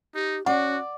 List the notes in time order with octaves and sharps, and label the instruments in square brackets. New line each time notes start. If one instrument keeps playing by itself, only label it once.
[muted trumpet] D#4 [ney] G4
[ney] C#4 [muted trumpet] F#4 [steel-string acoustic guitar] D5 [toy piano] F#5